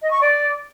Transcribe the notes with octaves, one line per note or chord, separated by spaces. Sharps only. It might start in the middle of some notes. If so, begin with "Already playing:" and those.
D#5
C#6
D5